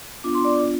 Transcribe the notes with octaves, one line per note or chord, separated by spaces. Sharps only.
B3 D4 F4 D6
C6
D5 D6